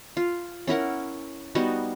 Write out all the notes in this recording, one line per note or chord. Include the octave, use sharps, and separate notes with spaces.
F4
C#4 E4 A#4 F#5
G3 B3 D#4 F#4